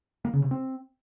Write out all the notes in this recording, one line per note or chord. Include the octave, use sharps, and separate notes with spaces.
A#3
C#3
C3
C4